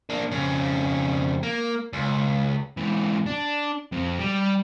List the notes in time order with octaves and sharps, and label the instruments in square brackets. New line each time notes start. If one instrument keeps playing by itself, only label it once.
[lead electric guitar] A#3 D4
F2 C#3
A#3
C#2
[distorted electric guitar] G#2 E3
D4
F2
G3